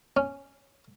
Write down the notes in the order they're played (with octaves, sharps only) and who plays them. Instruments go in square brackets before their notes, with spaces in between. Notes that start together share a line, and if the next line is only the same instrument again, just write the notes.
[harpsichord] C#4